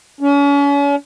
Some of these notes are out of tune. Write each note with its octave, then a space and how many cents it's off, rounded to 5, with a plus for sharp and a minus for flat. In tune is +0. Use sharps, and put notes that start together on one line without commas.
C#4 +40